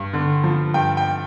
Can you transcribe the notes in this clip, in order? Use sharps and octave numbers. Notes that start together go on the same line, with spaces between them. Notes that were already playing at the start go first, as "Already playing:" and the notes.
Already playing: G2
D3
F3
G2 G5
G5